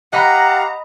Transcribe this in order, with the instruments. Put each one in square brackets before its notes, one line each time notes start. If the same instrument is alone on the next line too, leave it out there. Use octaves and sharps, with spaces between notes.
[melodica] G4 F5 [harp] D#5 B5 [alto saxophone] F#5 [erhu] A#5